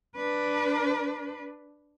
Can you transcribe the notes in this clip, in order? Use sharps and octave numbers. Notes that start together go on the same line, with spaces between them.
D4 B4